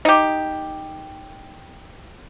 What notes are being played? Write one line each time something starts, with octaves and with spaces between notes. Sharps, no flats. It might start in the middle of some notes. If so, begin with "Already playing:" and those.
D#4 G4